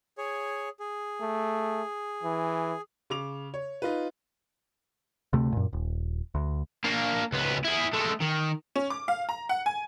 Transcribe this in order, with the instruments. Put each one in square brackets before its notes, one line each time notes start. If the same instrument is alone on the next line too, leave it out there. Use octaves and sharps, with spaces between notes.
[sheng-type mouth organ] G#4 C#5
G#4
[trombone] A3
E3
[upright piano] C#3 D6 F7
C#5
D#4 F4 B4
[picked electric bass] D2 C3 A3
F#2 A#2
D#1
D2
[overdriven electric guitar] A#3 D4
C#2 B3
E4 G#4
G#3 A3
D#3
[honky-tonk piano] C#4
D6
F5
A#5
F#5
G#5